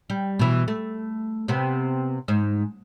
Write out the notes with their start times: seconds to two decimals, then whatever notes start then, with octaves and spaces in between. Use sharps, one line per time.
0.10 G3
0.39 B2 E3
0.68 A3
1.48 C3 B3
2.28 G#2